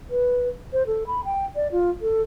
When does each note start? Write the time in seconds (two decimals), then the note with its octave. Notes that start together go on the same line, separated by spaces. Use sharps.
0.10 B4
0.73 C5
0.87 A4
1.07 B5
1.25 G5
1.55 D5
1.72 F4
2.01 A4